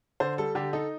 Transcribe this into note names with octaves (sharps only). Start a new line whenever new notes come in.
D3 C5
G3 A4
D3 G4
D#4 A4